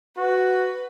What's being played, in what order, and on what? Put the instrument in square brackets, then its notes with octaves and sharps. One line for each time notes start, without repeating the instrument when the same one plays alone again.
[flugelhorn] F#4 [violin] B4